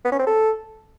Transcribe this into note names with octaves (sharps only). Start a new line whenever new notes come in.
B3
C#4
C4
A4